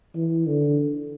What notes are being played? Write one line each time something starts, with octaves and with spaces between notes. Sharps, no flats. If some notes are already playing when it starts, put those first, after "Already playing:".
E3
D3